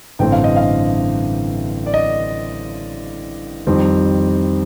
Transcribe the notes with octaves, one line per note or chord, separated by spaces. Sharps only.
A1 G2 D3 A3 C4 G5
F5
D#5
F5
D5
D#5
F2 D#3 G3 C4